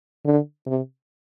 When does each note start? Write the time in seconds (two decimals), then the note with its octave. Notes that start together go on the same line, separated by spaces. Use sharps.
0.25 D3
0.66 C3